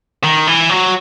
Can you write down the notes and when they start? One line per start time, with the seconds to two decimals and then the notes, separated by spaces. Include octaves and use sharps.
0.24 D#3
0.47 E3
0.69 F#3